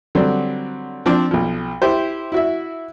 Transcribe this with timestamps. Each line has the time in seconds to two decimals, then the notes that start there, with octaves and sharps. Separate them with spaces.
0.15 D3 F#3 G3 C4
1.06 F3 C4 D4 D5
1.31 B1 F3
1.82 E4 G4 C5
2.32 E4 F#4 E5